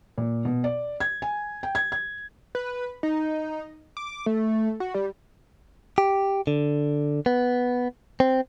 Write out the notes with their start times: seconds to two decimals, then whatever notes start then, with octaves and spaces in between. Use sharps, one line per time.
0.18 A#2
0.45 B2
0.64 D5
1.00 G#6
1.22 G#5
1.63 G5
1.75 G#6
1.92 G#6
2.55 B4
3.03 D#4
3.97 D6
4.26 A3
4.80 F#4
4.95 G3
5.98 G4
6.47 D3
7.26 B3
8.20 C4